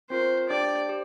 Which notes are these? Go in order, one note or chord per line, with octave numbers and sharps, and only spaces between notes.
C4 F4 A#4 C5
D4 G4 C5 D5 G5
G4 C5